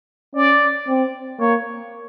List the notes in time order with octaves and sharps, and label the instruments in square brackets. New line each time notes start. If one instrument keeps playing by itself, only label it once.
[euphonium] C#4 [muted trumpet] D5
[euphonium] C4
[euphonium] A#3 [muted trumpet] C#5